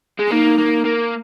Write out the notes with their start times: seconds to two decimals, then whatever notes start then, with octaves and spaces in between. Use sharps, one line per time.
0.19 G#3
0.30 A#3 D#4
0.58 A#3
0.85 A#3